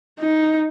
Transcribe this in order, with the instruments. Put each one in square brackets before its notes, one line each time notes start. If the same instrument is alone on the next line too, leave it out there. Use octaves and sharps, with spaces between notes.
[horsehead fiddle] D#4